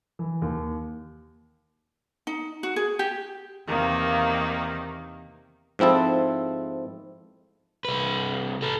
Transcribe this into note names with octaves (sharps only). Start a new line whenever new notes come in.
E3
D#2
D#4
F#4
G#4
G4
E2 C3 D#3 A#3
G#2 F3 C4 E4 A4
C2 B4
A4 B4